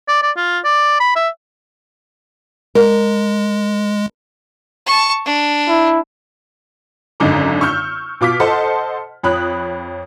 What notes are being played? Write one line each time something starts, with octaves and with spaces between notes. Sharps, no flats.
D5
D5
F4
D5
B5
E5
G#3 A#4
A5 C#6
D4
E4
G#1 F#2 D3 D#4 A#5 D6
C#6 E6 F6 G6
B2 F4 D6 F6 B6
A4 C5 D#5 F#5 A5 C6
F2 C#5 B5 D#6 F#6